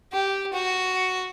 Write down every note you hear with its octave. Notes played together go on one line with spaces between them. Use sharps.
G4
F#4